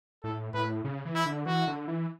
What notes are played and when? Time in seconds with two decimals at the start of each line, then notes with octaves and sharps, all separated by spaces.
0.24 A2 A4
0.54 A2 B4
0.84 C#3
1.05 E3
1.15 E4
1.25 D3
1.46 E3 F#4
1.67 D3
1.88 E3